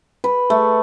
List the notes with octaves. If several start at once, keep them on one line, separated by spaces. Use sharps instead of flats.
B4
A3